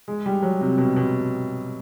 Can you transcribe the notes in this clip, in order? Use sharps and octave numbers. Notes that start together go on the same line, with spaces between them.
G#3
G3
F#3
C3
B2
B2